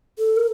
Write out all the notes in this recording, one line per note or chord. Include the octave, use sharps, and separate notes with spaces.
A4
A#4